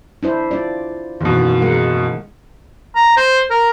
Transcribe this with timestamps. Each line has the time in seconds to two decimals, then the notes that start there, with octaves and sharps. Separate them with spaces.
0.23 D4 E4 C5
0.51 D4 F4 D5
1.21 F#1 B2 D#3 E3
1.62 G#3 A#4 F#5
2.95 A#5
3.17 C5
3.50 A#4